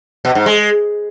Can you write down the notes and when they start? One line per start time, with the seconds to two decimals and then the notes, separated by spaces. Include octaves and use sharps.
0.25 B2
0.35 G#2
0.46 G#3